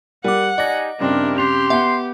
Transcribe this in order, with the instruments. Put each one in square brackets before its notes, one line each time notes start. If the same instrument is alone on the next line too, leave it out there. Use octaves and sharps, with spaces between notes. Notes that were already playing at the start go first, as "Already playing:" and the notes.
[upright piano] G3 [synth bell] A#4 D6 [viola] F#5
[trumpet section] D#4 G4 G#5 [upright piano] D5 [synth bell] D#5 A#6
[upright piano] G2 C#3 C4 [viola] D4 [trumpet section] E4 G4 A#4
[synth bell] C#4 F7 [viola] G4 [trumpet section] C6
[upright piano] B3 F#5 [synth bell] E5